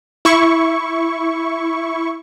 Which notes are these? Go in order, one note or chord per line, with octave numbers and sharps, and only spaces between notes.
E4 C#6